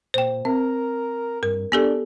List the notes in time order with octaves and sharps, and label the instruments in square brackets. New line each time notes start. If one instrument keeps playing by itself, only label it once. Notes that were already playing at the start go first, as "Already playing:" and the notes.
[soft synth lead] A#2 [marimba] C5 G5
[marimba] C4 [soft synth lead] A#4
[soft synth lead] G2 [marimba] A#4
[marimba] B3 G4 A4 [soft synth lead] D4